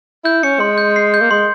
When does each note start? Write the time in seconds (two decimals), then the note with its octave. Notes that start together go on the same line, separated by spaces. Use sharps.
0.25 E4 G6
0.43 C#4 C#7
0.60 G#3 C6
0.78 G6
0.96 C7
1.14 G6
1.21 A#3
1.31 G#3 C6